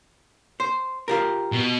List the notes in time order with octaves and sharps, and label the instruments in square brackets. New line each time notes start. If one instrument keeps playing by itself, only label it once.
[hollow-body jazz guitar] C5
F4 G4 A#4
[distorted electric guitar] B2